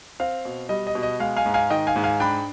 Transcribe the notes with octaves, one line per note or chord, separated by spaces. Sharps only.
C4 F5
B2
G3 D#5
D#5
B2
D#5
G#3 F5
F5 G#5
G#2
F5 G#5
D#3 D#5 G5
F5 G#5
G#2
F5 G#5
D4 G5 B5